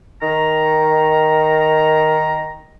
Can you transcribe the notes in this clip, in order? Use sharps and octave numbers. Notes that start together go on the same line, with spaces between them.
D#3 A#5